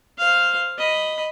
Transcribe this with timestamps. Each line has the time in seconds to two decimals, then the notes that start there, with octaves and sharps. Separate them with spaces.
0.19 C5 F5
0.78 D#5 B5